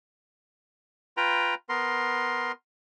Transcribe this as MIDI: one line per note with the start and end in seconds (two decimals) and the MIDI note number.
1.17 1.54 65
1.17 1.54 71
1.17 1.54 79
1.17 1.54 82
1.69 2.52 59
1.69 2.52 70
1.69 2.52 84